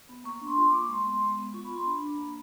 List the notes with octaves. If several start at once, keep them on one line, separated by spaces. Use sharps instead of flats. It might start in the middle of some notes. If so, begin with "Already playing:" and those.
B3
A#3 C#6
C#6
D4 C6
F4 C6
D6
A#3
C#6
G#3 C6
B3
G#3
B3
F4 C#6
B5
F4 C6
D4 B5
D4
A#3